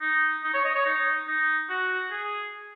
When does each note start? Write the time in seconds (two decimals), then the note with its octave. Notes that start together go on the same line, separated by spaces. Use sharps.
0.01 D#4
0.44 D#4
0.54 C#5
0.64 D#5
0.75 C#5
0.86 D#4
1.28 D#4
1.69 F#4
2.11 G#4